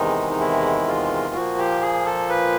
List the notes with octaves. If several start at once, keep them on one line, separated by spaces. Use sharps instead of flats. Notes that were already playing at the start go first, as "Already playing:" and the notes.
Already playing: E2 C3 D#3 G#3 D#4
D#4
E4
F4
A#2 F3 A#3 F#4
G4
G#4
A4
B4